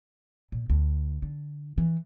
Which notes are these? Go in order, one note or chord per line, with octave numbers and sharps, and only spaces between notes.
A#2
D2
D3
E3